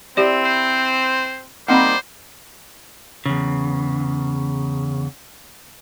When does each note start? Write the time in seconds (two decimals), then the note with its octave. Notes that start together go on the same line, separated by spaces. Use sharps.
0.17 C4 E4 G4 D5
0.44 C5
1.68 G3 A#3 C4 D#4 C5 F#5 B5
3.26 E2 C#3